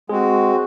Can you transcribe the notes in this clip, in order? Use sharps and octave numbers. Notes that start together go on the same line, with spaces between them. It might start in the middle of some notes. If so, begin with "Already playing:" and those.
G#3 C4 F#4 G#4